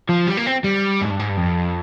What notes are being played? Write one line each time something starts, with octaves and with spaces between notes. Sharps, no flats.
F3
G3
A#3
C4
G3
G#2
G2
G#2
G2
F2